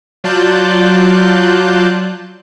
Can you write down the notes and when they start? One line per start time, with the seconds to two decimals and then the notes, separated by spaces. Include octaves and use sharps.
0.24 F#3 F4 D5 A5 F#6 G6